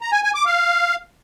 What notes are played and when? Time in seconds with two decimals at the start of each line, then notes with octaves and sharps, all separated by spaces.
0.01 A#5
0.12 G#5
0.23 G#5
0.35 D6
0.46 F5